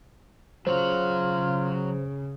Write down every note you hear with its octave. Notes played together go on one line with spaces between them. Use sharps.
C#3 F#3 F4 C5 C#5